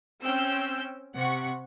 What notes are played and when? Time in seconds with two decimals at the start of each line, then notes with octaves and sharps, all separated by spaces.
0.22 C4 C#4 G5 E6 G6
1.15 C3 F#5 C#6